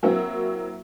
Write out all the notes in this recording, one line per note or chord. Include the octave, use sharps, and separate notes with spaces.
F#3 A#3 C4 E4 F#4